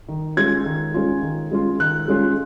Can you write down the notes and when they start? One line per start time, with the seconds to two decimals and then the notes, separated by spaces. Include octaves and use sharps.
0.08 D#3
0.37 G#3 C#4 F4 G#6
0.66 D#3
0.94 G#3 C#4 F4
1.22 D#3
1.51 G#3 C#4 F4
1.80 D#3 F#6
2.08 G#3 C#4 F4